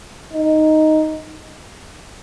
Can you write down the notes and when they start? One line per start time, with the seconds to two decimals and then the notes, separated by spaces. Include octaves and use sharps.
0.32 D#4